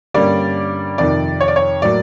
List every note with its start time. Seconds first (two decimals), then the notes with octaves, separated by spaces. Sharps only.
0.14 G2 D3 G3 A#3 C#4 D5
0.98 F2 C3 D#3 D5
1.40 C#5
1.48 D5
1.56 C#5
1.82 A2 F#3 A#3 D5